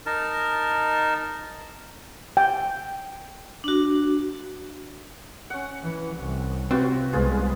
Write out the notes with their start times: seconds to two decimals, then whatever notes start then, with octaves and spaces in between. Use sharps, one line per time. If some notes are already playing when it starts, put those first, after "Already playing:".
0.06 D#4 A#4 A5
2.37 G5
3.64 D4 F#4
5.50 C#4 F#5
5.82 E3
6.15 C2
6.71 C3 C4 F4 F#4 B4
7.13 C2 G#3 B3 F4 G#4 B4